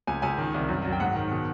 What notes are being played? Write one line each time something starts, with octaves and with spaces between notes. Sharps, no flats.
C#2 G#5
C#2 G#5
D#3
C2
F#2
F#3
G5
G#2 F#5
D#3
B2